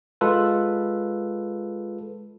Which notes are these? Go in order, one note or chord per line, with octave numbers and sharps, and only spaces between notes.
G#3 F4 A4 B4